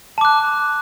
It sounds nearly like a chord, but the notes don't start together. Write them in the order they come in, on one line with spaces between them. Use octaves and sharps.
A5 D6 F#6